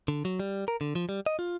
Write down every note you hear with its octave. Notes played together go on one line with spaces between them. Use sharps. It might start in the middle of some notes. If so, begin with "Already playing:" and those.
D3
F#3
G3
A#4
D3
F3
G3
D#5
F4